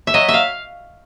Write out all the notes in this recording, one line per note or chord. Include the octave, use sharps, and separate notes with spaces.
E5
F#3 D#5
E5
F5